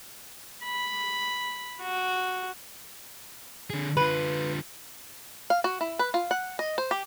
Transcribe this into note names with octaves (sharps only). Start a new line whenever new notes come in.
B5
F#4
D3 G#4
D3 F4 B4
F5
F#4
E4
B4
F4
F#5
D#5
C5
G4